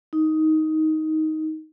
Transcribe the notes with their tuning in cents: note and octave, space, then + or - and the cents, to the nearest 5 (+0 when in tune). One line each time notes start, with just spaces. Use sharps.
D#4 +10